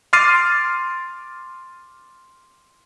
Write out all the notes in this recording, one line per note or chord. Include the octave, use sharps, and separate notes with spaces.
C6 D6 F6 A6 C7 D#7